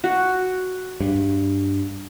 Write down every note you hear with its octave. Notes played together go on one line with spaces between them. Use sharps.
F#4
G2